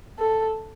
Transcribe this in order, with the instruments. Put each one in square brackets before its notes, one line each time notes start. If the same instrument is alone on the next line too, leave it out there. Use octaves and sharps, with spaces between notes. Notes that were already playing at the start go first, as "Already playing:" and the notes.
[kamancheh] A4